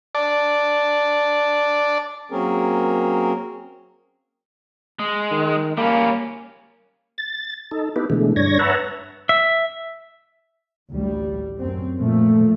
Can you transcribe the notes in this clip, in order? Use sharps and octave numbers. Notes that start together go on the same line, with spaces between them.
D5 A5
F#3 A#3 C4 C#4 G#4 A#4
G#3
D#3
G3 A#3 C#4
A6
D#4 A4
B3 D#4 E4 G4 B4
B2 D3 E3 G#3 A3
G2 D4 C#5 G#6 A#6
B4 C#5 E5 F#5 A5 A#5
E5
A1 D2 G3
F#2 C4
A#2 F3 A3